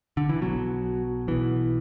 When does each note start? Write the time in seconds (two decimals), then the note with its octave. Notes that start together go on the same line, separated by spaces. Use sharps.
0.17 D3
0.29 E3
0.41 B1 B2 F#3
1.28 B1 B2 E3